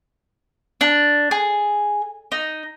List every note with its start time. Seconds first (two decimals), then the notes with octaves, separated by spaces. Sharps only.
0.81 D4
1.31 G#4
2.32 D#4